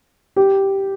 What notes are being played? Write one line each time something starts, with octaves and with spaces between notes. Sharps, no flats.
G4